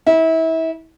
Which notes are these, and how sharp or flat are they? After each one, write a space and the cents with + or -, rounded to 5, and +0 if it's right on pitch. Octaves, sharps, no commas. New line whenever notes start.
E4 -30